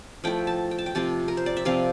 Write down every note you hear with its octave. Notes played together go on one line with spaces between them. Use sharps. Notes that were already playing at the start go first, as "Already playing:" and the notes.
F3 A3 E4 G5
A5
G5
A5
G5
C3 F3 C4 F4 A5
A#4
C5
D5
E5
C3 F3 C4 F4 F5